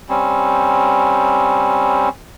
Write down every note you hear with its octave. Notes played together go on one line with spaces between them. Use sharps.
G3 C4 C#4